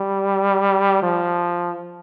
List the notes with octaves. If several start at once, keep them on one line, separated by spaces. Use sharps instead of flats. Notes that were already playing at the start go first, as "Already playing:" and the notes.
Already playing: G3
F3